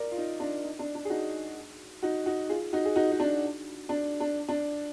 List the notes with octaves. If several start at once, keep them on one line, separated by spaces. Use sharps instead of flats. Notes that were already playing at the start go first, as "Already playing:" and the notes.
Already playing: A#4 D5
F4
D#4
D4 F4
D#4
D4
D4
G#4
D#4 F#4
D#4 F#4
D#4 F#4
F4 G#4
D#4 F#4
G#4
D#4 F#4
D#4
D4
D4
D4
D4